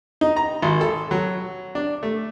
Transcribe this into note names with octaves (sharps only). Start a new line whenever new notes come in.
D#4
A#5
G#1
A4
F#3
D4
A3